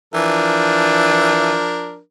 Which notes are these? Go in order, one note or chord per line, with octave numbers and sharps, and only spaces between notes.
E3 F3 D4 A#4